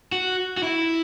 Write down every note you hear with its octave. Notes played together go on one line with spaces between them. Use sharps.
F#4
F#4
E4